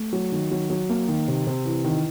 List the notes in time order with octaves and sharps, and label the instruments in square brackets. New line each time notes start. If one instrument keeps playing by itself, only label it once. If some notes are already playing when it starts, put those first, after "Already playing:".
Already playing: [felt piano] A3
F#3
D#3
F#3
F#3
A#3
D#3
C3
C3
E3
D#3